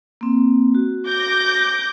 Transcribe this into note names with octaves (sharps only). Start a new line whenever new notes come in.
A#3 C4
F#4
D6 G6 A#6